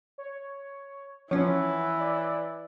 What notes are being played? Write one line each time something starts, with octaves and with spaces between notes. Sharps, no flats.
C#5
E3 F3 C#4 C#5 F#5
D5